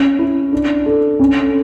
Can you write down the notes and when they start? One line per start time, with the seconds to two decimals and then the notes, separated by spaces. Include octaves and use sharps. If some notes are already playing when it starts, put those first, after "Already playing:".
Already playing: C#4
0.19 E4
0.53 D4
0.86 A4
1.20 C#4